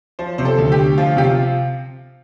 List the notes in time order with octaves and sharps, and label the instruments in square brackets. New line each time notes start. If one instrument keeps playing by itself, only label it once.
[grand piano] F3 C5
C3 C5
A4
D2
G4
D2
F3 F4
C3 G4
F4